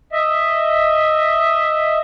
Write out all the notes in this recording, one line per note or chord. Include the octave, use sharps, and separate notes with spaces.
D#5 E5